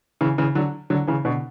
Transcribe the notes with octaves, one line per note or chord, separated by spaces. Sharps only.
C#3 E3
C#3 E3
D3 F#3
D3 F#3
C#3 E3
B2 D3